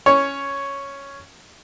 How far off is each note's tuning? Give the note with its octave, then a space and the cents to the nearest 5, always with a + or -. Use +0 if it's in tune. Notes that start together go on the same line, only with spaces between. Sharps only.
C#4 +0 C#5 +0